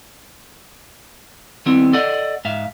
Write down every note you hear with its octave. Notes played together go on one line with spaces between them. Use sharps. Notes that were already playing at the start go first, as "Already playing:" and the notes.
D#3 G3 B3 C4 E4
A4 D5 D#5 F#5
G#2 E5 F5